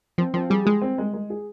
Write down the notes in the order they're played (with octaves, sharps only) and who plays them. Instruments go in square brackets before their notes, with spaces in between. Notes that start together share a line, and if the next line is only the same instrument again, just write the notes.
[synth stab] F3 [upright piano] C4
[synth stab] F3 [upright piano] C4
[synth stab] G3 [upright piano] G#4
[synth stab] G#3 [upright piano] G#4
[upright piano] C4
G#3
G#3
G#4